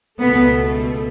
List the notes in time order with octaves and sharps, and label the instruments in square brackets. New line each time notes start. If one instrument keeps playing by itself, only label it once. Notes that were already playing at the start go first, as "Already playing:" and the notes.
[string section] C#2 B2 A3 [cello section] B3